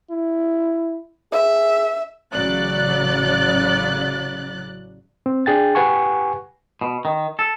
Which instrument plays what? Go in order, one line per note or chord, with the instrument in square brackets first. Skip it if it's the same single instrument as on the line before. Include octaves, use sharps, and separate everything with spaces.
[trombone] E4
[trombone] G#4 [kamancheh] E5
[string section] A1 C#3 F#3 D5 F#6 A6
[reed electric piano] C4
D4 G#4 G5 A6
G4 B4 F#5 G#5 C#6
[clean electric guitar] B2
D#3
A4